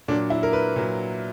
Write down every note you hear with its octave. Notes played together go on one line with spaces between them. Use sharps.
A#2 F#3 D4
E4
A#4
B4
A#2 F#3